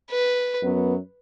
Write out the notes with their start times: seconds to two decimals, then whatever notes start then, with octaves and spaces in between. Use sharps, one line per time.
0.11 B4
0.60 F#2 F#3 B3